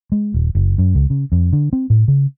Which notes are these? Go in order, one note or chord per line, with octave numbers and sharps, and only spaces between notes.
G#3
D#1
F#1
F#2
C#2
C#3
F2
D3
C4
A2
C#3